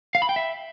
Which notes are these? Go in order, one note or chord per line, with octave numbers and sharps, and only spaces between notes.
F5
B5
G5
E5